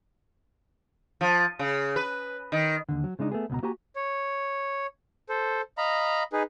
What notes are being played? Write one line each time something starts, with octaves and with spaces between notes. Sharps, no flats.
F3
C#3
B4
D#3
D#2 D3
F#3
C#3 G#3 D4 D#4
A3 B3 G#4
C#2 B2 A#5
A#3 F#4 G4 G#5 A#5
C#5
A4 C5
D#5 F5 A#5 B5
D#4 G#4 B4